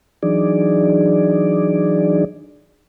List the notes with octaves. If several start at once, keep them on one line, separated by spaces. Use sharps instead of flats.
E3 F#3 D4 D#4 G#4 D5